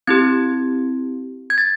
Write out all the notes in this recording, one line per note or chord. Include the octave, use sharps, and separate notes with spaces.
C4 E4 G4 G#6
G#6
A6